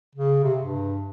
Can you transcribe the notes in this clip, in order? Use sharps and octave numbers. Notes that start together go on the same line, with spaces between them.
C#3
C3
G2